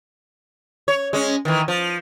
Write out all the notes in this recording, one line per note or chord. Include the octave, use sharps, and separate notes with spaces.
C#5
G#3 C#4
D#3 E3
F3